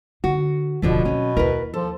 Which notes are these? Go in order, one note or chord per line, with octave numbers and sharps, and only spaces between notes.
D3 F#4
D1 B1 B2 D3 F3 A3
F#3 C4 C#4
D#2 E4 A#4 B4
F3 A4